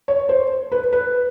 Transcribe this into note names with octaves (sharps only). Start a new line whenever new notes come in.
C#5
C5
B4
B4